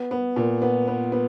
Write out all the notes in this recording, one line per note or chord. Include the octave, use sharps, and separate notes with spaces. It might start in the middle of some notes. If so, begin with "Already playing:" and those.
Already playing: B3
B3
A#2
B3
B3
B3